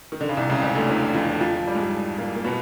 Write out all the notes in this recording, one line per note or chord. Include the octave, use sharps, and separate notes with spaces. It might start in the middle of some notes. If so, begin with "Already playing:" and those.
D#3
D3
C#3
C2 C3
C#2 C#3
C#2 C#3
D2 D3
E2 E3
F2 F3
F2 F3
G3
G#2 G#3
A#2 A#3
A#3
B2 B3